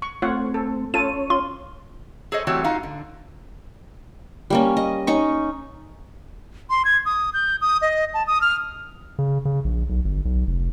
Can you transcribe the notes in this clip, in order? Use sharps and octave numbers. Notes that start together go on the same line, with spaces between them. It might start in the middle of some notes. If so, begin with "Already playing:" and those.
C#6
A3 C4 F4 C#5 F#5
A4
C#4 F4 A4 C#5 A5 D#7
F4 C6
G#4 A4 C5 C#5 D#5
E3 G3 A3 C4 F#4 C#5
D#4 F4 F#4 F5
D3
G3 A#3 C#4
D#5
C#4 D#4 C#6
C6
G#6
D#6
G6
D#6
D#5
A5
D#6
F6
C#3
C#3
A#1
B1
G1
B1
F1